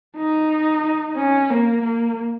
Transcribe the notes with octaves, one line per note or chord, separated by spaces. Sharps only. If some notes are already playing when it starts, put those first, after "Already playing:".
D#4
C#4
A#3
A#3